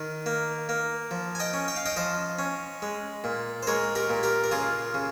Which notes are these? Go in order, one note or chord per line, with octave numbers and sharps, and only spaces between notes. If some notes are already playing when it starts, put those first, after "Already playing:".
Already playing: D#3
A#3
A#3
F3
G#5
D#5 G5
C#4
G5
F5
D#5 G5
F3 C5 D#5
C#4
G#3
A#2
C5
G#3 A#4 C#5
G4 A#4
A#2
G4 A#4
A#4
C#3 F4 G#4
C#3